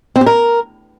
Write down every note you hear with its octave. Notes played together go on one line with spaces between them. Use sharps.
C4
G4
A#4